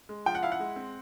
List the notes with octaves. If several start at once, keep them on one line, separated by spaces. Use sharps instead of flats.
G#3
F3 G5
F#5
E4 F5
F#5
G#3
C4